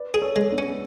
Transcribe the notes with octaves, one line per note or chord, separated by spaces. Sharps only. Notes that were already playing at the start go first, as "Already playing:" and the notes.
Already playing: B4 D5
G#4
A4 C#5
G#3
B3 D4
C#4